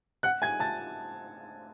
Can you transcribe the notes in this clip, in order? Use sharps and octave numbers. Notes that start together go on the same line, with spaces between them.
F#5 F#6
G#5 G#6
A5 A6